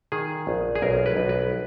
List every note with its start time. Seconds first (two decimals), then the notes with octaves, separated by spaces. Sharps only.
0.12 D#3 G#4
0.47 A#1
0.75 G#4
0.82 B1 A#4
1.06 B4
1.17 B1
1.29 B4